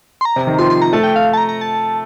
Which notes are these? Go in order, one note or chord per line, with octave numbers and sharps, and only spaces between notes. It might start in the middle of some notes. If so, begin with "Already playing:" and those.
C6
A#5
C3
D#3
F3 C6
C6
A#5
A3 A5
G5
F5
A5
A#5
A#5
A5